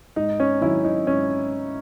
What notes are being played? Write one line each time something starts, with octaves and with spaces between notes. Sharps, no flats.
G#2 D#4
C#4
D#3 F#3 C#4 E4
D#4
G#2 C#4